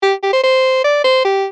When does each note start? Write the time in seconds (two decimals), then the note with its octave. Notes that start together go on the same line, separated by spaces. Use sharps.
0.03 G4
0.23 G4
0.33 C5
0.44 C5
0.84 D5
1.04 C5
1.25 G4